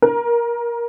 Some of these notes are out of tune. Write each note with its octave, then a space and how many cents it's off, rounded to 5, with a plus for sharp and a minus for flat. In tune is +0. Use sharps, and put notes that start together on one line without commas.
A#4 +25